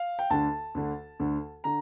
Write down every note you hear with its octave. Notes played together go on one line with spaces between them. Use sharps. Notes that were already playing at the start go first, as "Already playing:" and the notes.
Already playing: F5
G5
D2 D3 A5
D2 D3
D2 D3
D3 A#5